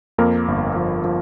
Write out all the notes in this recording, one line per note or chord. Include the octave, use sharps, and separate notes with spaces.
F2 A#3 A#4
G1
F3
F3